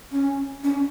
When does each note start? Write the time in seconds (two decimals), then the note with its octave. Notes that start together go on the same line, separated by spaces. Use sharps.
0.12 C#4
0.64 C#4